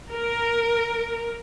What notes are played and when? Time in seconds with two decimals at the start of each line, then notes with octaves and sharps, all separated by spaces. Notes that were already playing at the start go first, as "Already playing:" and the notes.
0.12 A#4